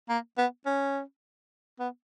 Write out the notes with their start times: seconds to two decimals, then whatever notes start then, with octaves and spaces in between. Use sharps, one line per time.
0.09 A#3
0.38 B3
0.66 C#4
1.79 B3